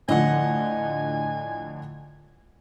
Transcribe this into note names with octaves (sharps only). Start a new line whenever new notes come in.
A2 D3 F3 D#5 F#5 G#5